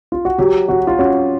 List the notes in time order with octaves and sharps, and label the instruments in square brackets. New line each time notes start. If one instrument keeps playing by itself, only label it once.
[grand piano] F4
F#4
[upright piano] F#3 [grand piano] G4
[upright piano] F#3 [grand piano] F#4
[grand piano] F4
[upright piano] C#4 [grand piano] F#4